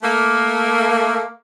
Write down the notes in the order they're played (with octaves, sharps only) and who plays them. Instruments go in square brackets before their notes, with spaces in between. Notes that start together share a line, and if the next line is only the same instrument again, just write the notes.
[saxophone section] A3 A#3